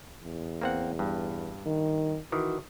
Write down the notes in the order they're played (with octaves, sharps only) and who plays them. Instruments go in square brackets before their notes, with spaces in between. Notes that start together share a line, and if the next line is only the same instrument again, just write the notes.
[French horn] E2
[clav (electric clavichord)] A#3 C4 F#5
G2
[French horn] D#3
[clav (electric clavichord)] D#3 E3 [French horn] F#4